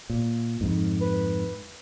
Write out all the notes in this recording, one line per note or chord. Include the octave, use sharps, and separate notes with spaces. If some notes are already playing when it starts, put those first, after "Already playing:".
A#2
F2 G#2
B4